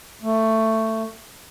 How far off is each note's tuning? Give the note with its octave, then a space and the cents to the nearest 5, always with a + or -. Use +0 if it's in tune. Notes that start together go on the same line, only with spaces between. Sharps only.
A3 +15